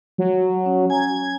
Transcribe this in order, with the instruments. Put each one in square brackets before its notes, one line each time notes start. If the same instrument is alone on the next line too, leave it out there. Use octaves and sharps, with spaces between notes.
[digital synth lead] F#3
[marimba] C#4
[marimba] G#5 A#5 [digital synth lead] G#6